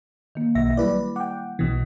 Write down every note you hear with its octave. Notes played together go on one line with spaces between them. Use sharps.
D#3 A#3
B1 E5 A#6
F#3 G3 E4 G4 B4 D5
F#5 G5 D6
B1 B2 E3